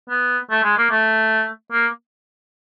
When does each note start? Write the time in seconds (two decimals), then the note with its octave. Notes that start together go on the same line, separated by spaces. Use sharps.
0.09 B3
0.51 A3
0.64 G#3
0.78 A#3
0.91 A3
1.72 A#3